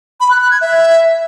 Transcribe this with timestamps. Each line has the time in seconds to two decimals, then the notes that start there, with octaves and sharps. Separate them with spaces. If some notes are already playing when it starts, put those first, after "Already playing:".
0.20 B5
0.31 F#6
0.41 F#6
0.51 G#6
0.61 E5